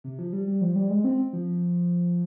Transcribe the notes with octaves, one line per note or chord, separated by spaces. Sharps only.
C3
F3
G3
G3
F3
G3
G#3
C4
F3